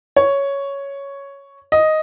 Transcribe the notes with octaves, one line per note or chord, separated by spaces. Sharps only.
C#5
D#5